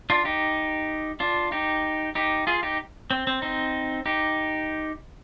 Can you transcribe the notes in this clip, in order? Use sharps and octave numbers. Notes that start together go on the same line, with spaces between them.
D4 F4
D#4 G4
D4 F4
D#4 G4
D#4 G4
F4 G#4
D#4 G4
C4
C4
C4 D#4
D#4 G4